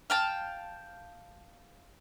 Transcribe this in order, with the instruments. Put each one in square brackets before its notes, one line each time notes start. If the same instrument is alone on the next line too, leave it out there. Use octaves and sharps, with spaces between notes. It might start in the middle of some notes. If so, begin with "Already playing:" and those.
[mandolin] F5 G5 A5